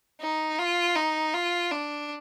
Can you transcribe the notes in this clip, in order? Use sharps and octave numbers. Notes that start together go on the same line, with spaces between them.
D#4
F4
D#4
F4
D4